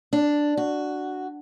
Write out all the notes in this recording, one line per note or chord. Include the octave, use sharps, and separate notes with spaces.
D4
F#4